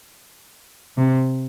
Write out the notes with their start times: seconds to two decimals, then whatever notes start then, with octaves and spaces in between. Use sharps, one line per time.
0.98 C3